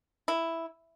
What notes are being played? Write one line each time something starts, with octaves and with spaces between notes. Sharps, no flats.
E4